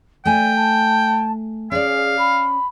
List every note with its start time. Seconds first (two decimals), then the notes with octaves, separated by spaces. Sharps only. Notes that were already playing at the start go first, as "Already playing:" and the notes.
0.25 A3 D5 G5 G#5
0.55 A5
1.72 C#4 G#4 D5 F5
2.18 B5